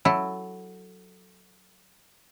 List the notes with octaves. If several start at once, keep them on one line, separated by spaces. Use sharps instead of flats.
F#3 E4 A4